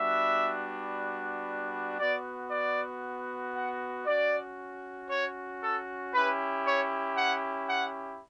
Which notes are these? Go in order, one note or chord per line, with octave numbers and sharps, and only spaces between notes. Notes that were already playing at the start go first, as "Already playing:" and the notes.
Already playing: G3 B3 D4 F#4 E5
B3 F#4 D5
D5
F#5
C#4 F#4 D5
C#5
A4
C#4 E4 G4 B4
C#5
F#5
F#5